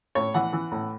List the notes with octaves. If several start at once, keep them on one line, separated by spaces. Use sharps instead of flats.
A2 C#5
E3 F#5
E3
A2